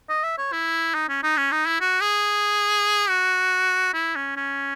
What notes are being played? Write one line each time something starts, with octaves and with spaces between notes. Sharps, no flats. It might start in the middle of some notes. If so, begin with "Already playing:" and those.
D#5
E5
C#5
E4
D#4
C#4
D#4
C#4
D#4
E4
F#4
G#4
F#4
E4
C#4
C#4